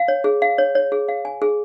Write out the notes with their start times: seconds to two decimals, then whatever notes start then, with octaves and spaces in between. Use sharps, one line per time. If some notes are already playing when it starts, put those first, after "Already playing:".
Already playing: F5
0.08 C#5
0.24 G#4
0.42 F5
0.58 C#5
0.75 C#5
0.92 G#4
1.08 F5
1.25 G#5
1.42 G#4